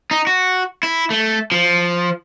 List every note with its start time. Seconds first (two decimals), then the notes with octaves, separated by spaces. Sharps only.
0.11 D#4
0.27 F#4
0.83 E4
1.10 A3
1.52 F3